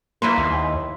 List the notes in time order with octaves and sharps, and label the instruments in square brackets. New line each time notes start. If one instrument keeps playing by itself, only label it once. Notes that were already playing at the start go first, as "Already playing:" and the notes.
[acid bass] A#3 [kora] E4 B4 C5
[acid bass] D#2